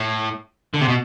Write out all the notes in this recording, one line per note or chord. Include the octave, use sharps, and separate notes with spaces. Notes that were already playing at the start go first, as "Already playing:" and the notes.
Already playing: A2
D3
C3
B2